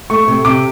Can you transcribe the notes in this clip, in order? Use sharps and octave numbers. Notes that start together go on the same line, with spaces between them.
A3 C#6
C3
C3 D6